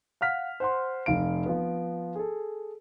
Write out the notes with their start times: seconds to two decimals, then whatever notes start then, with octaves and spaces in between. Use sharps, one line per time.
0.21 F5 F#5 F6 B6
0.60 C5 F#5 C6
1.06 F1 F5 D7
1.46 F3 B3
2.16 G#4 A4